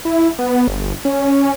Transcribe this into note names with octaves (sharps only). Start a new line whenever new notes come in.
E4
B3
G1
C#4